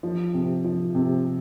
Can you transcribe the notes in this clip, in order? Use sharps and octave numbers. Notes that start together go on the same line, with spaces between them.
F3
C3
F3
C3